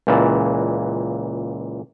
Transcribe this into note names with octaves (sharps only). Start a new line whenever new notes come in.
C#2 A#2 E3 A5